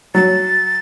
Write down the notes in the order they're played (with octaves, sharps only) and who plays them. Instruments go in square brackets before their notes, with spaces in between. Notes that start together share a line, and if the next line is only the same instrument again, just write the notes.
[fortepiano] F#3 [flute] A6